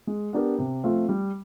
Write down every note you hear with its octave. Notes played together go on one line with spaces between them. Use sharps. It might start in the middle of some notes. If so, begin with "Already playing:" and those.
G#3
B3 D4 G4 A#4
C3
F3 A3 C4 F4
G3